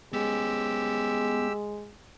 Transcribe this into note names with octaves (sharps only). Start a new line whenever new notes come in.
G#3 B3 C#4 G4 E6